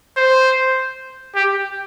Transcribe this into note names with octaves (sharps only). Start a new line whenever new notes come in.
C5
G4